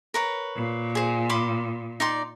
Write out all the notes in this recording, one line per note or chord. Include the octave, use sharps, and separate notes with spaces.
A#4 B4 C#5
A#2
G#4 C5
B5 C6 D6
D#4 D5 C6